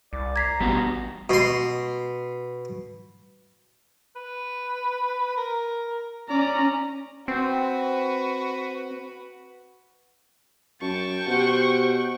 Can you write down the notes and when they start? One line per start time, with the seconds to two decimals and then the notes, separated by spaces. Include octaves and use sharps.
0.13 C2 D5
0.36 A#5 G#6 B6 C7
0.60 A1 G3 B3 F#4
1.29 B2 C6
4.16 B4
5.37 A#4
6.30 C#4 D5 A#5
7.28 C4 F#4 B4
10.82 F#2 G5 A5 C#6
11.27 B2 G4 C5 F#5